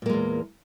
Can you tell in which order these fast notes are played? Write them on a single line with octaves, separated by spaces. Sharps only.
A#2 A#3 G#3 E2